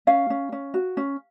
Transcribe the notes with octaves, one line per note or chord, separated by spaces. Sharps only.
C#4 F5
C#4
C#4
F#4
C#4